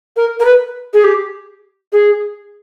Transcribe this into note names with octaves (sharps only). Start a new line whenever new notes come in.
A#4
A#4
B4
G#4
G4
G#4